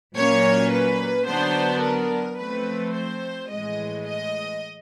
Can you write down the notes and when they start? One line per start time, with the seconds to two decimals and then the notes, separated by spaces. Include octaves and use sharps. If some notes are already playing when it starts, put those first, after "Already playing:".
0.16 A#2 F#3 A#3 C#4 C#5
0.72 B4
1.27 D3 F#3 B3 D4 C5
1.83 A#4
2.38 F3 A3 C4 B4
2.94 C5
3.50 A2 E3 G#3 D#5
4.06 D#5